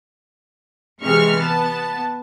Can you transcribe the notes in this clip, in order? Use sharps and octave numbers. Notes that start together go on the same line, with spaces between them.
C3 E3 G#3 C#6 F6
B3 A5